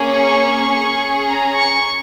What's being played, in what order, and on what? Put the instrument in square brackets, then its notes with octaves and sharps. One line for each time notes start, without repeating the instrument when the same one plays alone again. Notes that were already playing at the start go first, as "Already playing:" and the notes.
Already playing: [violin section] A#3 C#4 G#4
C#6
C#4 G#4
A#5
C#6